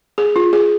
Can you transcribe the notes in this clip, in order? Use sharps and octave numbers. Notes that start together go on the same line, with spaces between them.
G#4
F4
G#4